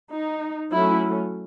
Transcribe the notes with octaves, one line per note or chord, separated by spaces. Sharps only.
D#4
F#3 A3 C#4 E4